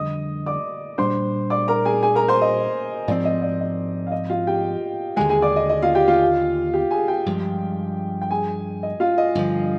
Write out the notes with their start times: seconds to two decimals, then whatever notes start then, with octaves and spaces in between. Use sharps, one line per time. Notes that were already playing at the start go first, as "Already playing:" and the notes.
Already playing: F2 D3 G3 D#5 D#6
0.46 D5 D6
0.98 A#2 G3 D4 C5 C6
1.50 D5 D6
1.68 A#4 A#5
1.85 G#4 G#5
2.03 G#4 G#5
2.15 A#4 A#5
2.28 C5 C6
2.42 D#5
3.08 G#2 F3 C4 D5
3.25 D#5
3.42 D5
3.60 D#5
4.07 F5
4.12 D#5
4.30 F4 F5
4.47 G4 G5
5.17 D#2 D3 G#3 G#4 G#5
5.29 G#4 G#5
5.42 D5 D6
5.56 D#5
5.69 D#5
5.82 F4 F5
5.95 G4 G5
6.08 F4 F5
6.74 G4 G5
6.91 G#4 G#5
7.08 G4 G5
7.26 G2 F3 G#3
8.22 G5
8.30 G#4 G#5
8.83 D#5
9.00 F4 F5
9.18 D#5
9.35 G2 D3 F3